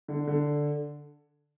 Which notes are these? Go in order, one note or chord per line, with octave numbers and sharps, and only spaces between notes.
D3
D3